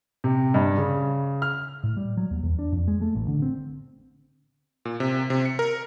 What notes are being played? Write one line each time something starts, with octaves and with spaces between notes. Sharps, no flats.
C3
G2
C#3
F6
A2
G3
F#3
D#2
E2
D4
F2
G#3
A3
A1
D3
C4
A#2
C3
C3
C#7
A#4